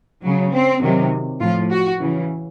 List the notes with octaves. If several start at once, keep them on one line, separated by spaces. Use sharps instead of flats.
C#3 F#3
C4
C3 D#3 F#3
A2 F3 F4
F#4
C#3 E3